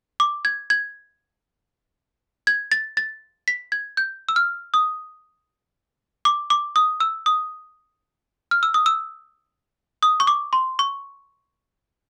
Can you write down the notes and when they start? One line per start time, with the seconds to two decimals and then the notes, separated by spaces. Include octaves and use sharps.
0.20 D6
0.45 G#6
0.70 G#6
2.47 G#6
2.72 A6
2.97 A6
3.48 B6
3.72 G#6
3.97 G6
4.29 E6
4.36 F6
4.74 D#6
6.25 D6
6.50 D6
6.76 D#6
7.00 E6
7.26 D#6
8.51 F6
8.63 E6
8.74 D#6
8.86 E6
10.03 D#6
10.20 C#6
10.27 D6
10.53 C6
10.79 C#6